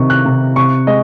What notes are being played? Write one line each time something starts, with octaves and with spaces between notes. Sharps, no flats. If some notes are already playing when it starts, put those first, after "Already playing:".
Already playing: C3 D#3 C#6
F#6
C3
C3 C#6
G#3 D#5